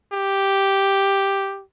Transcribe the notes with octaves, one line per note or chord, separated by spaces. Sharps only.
G4